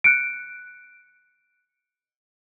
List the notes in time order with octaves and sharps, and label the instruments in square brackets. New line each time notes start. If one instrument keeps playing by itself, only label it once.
[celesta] F#6 C#7 D7